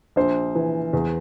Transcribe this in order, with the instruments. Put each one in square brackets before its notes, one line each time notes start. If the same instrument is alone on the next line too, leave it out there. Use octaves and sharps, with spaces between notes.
[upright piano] A#1 C5
E3
E2